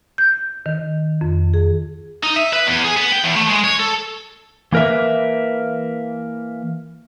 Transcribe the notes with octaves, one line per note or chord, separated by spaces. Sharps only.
G6
D#3
F2
G#4
D#4
E5
B4
E2
G#4
B3
G5
E2
A3
G#3
C#5
A4
E3 A#3 A#4 B4 E5